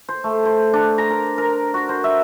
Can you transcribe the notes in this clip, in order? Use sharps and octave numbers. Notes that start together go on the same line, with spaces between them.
C5
A3
C5
D4
A#5
A#4
A#4
F#4
C5
E5